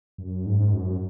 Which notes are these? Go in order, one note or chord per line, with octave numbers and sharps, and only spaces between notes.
F#2
G#2
F#2